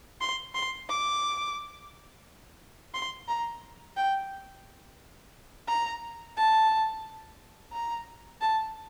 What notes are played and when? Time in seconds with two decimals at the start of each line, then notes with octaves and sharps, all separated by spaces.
0.21 C6
0.55 C6
0.89 D6
2.94 C6
3.28 A#5
3.97 G5
5.68 A#5
6.37 A5
7.73 A#5
8.41 A5